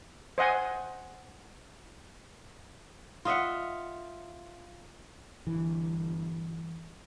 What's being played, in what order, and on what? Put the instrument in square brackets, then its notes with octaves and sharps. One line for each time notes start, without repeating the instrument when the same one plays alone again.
[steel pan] C5 D#5 F#5 G#5
[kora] F4 D#5 E5 F#5
[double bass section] G1 [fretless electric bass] E3